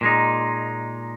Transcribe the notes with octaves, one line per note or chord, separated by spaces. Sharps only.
A#2 G#3 D#4